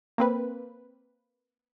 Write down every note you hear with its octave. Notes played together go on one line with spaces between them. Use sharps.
A#3 C4 B4